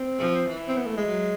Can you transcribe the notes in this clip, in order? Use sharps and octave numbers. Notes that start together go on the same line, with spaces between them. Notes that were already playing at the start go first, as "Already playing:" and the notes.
Already playing: C4
F3
E3
C4
B3
A3
G#3
F#3